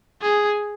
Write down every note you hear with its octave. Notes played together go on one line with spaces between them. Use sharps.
G#4